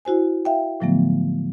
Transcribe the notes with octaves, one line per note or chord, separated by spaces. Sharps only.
E4 F#4 C5 G#5
E5 F5 G5
A2 D3 F3 F#3 A3 B3